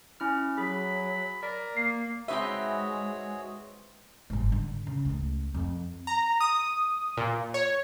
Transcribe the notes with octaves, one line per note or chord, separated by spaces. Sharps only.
C#4 E4 F6
F#3 G#4 B5
A#4 D5
A#3 C7
G#3 C4 D#4 F#4 G#4 B4 C#5 E5
G1 G#2
D3
C#3
C#2 A3
F2
A#5
D#6
A#2
C#5